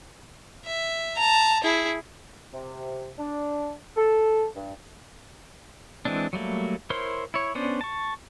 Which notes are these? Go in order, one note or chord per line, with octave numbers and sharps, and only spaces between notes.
E5
A5 A#5
E4 G#4
C3
D4
A4
G2
E3 G#3 C4 D4
F#3 G3 A3 A#3
E4 A#4 C5 C#5 C6
E4 C#5
B3 C#4 D4 C5 D5
A5 C#6